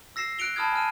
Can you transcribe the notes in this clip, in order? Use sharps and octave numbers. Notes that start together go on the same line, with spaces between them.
E6 A#6 C7 E7
F#6 A#6 C#7 D7 F7 G7
A5 B5 D#6 F6 G#6
G#5 A5 F6 D#7